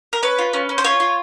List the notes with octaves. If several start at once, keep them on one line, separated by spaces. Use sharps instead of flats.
A#4
C#4 B4
F4
C#4
C#4
C5
F4 C#5
F4